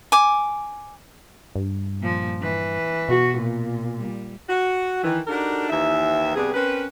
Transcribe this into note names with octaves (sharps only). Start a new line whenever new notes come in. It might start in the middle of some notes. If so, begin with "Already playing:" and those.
G#5 D6
G2
A#2 F3
E3 B4
B2 F#4
A#2
G3
F#4
D#3 E3
D4 D#4 F#4 G4 A4 A#4
D#2 E3 E5
G2 C3 B3 D4 G#4
C4 C#4 A#4 B4